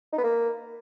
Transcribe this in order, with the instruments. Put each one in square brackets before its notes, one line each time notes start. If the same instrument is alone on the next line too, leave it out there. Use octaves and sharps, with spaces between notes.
[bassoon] D#4
B3
A#3